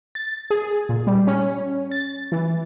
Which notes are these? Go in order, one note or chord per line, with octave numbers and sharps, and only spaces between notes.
A6
G#4
A#2
G3
C#4
A6
E3